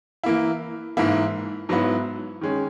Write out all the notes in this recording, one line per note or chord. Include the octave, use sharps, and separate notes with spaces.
E3 A#3 E4
G#2 E3 A#3 E4
G#2 F#3 B3 E4
D#3 G#3 C#4